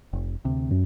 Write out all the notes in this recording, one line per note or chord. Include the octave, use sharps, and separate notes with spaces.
F1
D2 C3
F#2